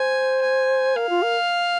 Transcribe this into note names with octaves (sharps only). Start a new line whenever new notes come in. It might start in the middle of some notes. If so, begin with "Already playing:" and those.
Already playing: C5 G#5
G#5
A#4 F5
F4
A#4